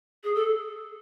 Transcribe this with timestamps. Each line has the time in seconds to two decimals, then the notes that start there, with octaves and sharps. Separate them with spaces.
0.24 G#4
0.35 A4